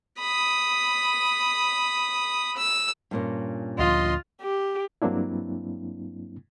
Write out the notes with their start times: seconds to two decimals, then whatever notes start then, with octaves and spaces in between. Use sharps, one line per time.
0.19 B5 D#6
2.57 E6
3.11 G2 A#2 C#4
3.79 D2 F3 F4 D#5 C6
4.41 G4
5.02 G2 F#3 A#3 C4 D4 E4